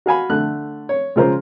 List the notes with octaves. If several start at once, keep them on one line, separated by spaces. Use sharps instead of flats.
F#4 F5 G#5 B5
D3 A3 F#6
C#5
C#3 G#3 F4 A#4 C5